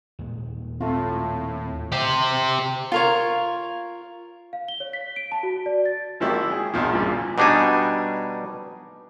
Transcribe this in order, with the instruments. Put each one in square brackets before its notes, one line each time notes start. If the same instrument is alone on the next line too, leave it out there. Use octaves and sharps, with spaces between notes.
[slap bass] D#2 A#2 G#3
[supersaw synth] A2 [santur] A3 F4 [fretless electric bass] C4
[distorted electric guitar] G4 C5
[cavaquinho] F4 A#4 C#5
[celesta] F5
G7
C#5
B6
D7
A5
F#4
D5
A6
[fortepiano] G#1 F3 A#3 E4 F#4 G4
G#4
A#1 E2 B2 F3
G2 A#2 C#3 E3 F3 G3
[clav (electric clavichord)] B2 G3 D4 D#4 G#5